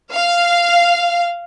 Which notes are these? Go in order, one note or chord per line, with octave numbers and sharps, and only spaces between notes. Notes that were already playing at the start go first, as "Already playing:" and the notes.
F5